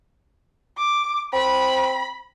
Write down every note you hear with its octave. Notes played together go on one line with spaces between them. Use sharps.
D6
C4 B5